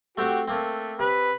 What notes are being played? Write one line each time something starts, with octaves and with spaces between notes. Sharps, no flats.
A3 C4 F#4 G4 C5
A3 A#3 C4
C3 B4